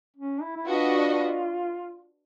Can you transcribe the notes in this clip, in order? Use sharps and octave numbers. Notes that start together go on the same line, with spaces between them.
C#4
E4
E4
D4 F4 F#4 B4 D#5